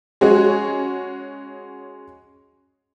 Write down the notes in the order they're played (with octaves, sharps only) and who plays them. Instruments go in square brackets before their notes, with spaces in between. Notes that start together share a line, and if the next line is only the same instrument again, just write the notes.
[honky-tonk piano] G#3 C#4 F#4 G#4